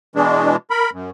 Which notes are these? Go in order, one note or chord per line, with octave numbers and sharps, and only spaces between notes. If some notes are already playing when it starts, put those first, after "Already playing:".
B2 E3 G#3 D4
A#4 B5
F#2